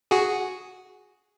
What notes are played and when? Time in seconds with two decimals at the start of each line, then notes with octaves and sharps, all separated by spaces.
0.11 F#4 G#4